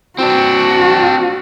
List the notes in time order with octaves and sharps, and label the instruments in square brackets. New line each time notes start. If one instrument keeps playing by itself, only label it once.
[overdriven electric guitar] C4 D4 [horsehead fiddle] F#4